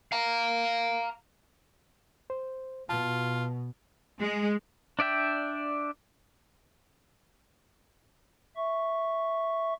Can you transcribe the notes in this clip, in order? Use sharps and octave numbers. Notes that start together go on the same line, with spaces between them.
F5 A#5
C5
B2 F4 A5
G#3
D4 D5 E5 G5
E5 C#6